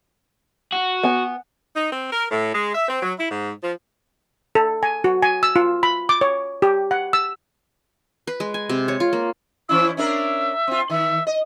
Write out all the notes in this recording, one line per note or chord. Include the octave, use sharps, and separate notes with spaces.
F#4
B3 G#5
D#4
C4
A#4
A2
G#3
E5
C4
F#3
E4
G#2
F3
A4
G#5
F#4
G#5
E6
F4
B5
D6
C#5
G4
F#5
E6
B4
G#3
G#5
C3
C#5
F4
A#3
E3 C#4 E4 E6
C#4 D4 A#4 E5
C4 F4
D#3 E5
D#5